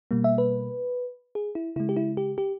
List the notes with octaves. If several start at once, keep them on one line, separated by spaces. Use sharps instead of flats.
B2 G3 A#3
E5
B4
G#4
E4
C#3 G#3 E4
G4
E4
G4
G4